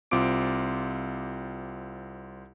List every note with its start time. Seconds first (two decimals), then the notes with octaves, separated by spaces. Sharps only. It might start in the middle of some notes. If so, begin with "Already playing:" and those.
0.11 C2 C4 F4 D6 D7